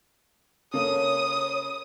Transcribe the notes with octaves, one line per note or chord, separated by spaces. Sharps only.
C#3 A#3 A4 C#5 D#6